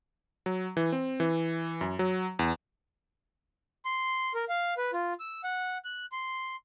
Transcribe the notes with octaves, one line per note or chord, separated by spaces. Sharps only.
F#3
E3
C4
E3
F#2
F#3
E2
C6
A#4
F5
B4
F4
E6
F#5
F#6
C6